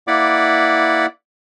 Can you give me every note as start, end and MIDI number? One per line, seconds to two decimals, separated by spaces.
0.07 1.06 58
0.07 1.06 64
0.07 1.06 74
0.07 1.06 78
0.07 1.06 83
0.07 1.06 86